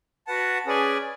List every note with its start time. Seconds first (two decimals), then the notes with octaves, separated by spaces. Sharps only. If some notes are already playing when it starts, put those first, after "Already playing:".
0.27 F#4 B4 F#5 A5
0.66 C#4 G#4 B4 D5 G#5